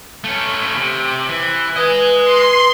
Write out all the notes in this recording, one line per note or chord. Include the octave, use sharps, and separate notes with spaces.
A3 C#4
C3
E3
B4 D#5 G#5
C6